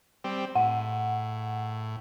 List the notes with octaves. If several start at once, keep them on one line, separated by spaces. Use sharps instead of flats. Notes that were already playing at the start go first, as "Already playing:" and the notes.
G3 C4
A2 F#5